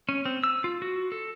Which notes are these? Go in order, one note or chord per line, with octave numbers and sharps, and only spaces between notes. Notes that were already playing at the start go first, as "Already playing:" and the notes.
C#4
C4
E6
F4
F#4
A4